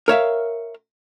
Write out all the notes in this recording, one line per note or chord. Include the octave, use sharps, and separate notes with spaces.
A#4 C#5 E5 F5